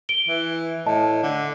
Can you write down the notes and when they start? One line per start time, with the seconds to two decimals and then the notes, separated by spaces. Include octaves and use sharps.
0.09 D7 G7
0.29 E3
0.86 A2 D#5 A5
1.23 D3